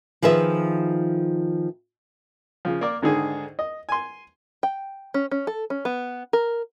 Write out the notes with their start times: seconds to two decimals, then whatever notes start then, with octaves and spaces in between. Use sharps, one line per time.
0.22 D#3 F3 G#4 B4 E5
2.65 C#3 F3
2.81 A#3 A#4 D5
3.02 G#2 D3 D#3 G#4
3.59 D#5
3.89 G#5 C6
4.63 G5
5.14 C#4
5.31 C#4
5.47 A4
5.70 C#4
5.85 B3
6.33 A#4